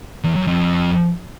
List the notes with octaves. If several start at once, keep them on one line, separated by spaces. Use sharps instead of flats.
E2
F#2
F2